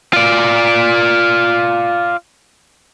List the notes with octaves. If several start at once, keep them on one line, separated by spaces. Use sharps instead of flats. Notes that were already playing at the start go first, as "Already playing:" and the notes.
F4 D5